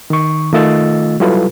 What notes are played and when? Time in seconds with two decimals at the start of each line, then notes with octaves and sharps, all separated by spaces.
0.10 D#3 C#6
0.53 D#3 A3 F4 D#5 E6 A6
1.20 F#3 G3 E4 F4 A4 B4